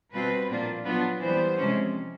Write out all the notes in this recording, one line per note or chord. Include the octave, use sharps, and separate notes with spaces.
B2 G3 C4 F4 B4
A#2 F3 A#3 D4 F4
F#3 B3 D4 F4
E3 G3 B3 C5
C3 F3 G#3 C#4